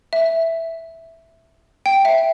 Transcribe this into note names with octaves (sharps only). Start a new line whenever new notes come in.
E5
G5
E5